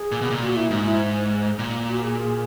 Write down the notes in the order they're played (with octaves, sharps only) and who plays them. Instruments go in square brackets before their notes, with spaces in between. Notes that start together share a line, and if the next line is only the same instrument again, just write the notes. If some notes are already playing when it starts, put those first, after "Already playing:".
Already playing: [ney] G#4
[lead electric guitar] A#2
B2
A#2
[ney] F#4
E4
[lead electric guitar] G#2 [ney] D#4
[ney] E4
[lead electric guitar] A#2
[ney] F#4
G#4
G#4